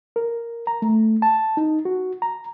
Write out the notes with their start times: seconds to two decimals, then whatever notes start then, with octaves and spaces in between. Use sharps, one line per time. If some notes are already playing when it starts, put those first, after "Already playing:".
0.16 A#4
0.67 A#5
0.82 A3
1.22 A5
1.57 D#4
1.85 F#4
2.22 A#5